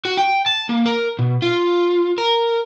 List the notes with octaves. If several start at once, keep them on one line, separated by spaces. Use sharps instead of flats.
F#4
G5
A5
A#3
A#4
B2
F4
A#4